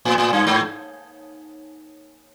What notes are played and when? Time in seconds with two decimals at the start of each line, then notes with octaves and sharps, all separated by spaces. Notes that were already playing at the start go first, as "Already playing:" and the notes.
0.05 A2
0.18 A2
0.33 G2
0.47 G#2